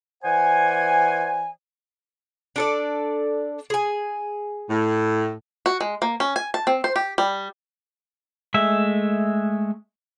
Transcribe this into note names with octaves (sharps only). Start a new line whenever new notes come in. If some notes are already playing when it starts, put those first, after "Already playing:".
E3 C5 D5 F#5 G#5
D4 A4 D5
G#4 G#5
A2
F#4
G#3
A#3
C#4
G#5
A5
C4
C5
G4
G3
G#3 A3 E5